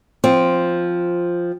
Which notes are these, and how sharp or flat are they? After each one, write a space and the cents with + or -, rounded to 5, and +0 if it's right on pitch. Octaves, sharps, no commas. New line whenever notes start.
F3 +0 C4 +0